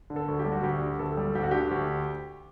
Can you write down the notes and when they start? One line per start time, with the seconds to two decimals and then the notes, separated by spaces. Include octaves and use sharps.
0.10 D3
0.16 A4
0.28 D2
0.39 G4
0.45 G3
0.52 F#4
0.63 D2 G4
0.81 D3
0.99 D2 A4
1.17 G3
1.35 D2 G4
1.43 F#4
1.51 D3 G4
1.71 D2